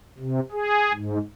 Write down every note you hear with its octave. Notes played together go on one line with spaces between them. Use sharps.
C3
G#4
G#2